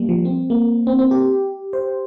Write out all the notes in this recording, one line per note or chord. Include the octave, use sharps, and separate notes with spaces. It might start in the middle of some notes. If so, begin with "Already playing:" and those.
Already playing: G3 A#3
F3
C4
A#3
C4
C4
G4
C5